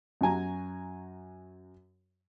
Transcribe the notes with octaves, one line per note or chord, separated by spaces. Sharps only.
F#2 F#4 G#5 A#5